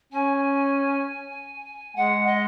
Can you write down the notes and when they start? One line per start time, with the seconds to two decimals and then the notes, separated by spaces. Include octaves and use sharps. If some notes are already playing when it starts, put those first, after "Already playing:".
0.12 C#4 G#5
1.96 G#3 F#5
2.27 D#5